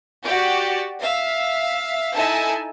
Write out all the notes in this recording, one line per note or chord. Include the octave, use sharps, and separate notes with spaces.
F#4 G4 D5
E5 F5
D#4 E4 A4 E5 G#5 A5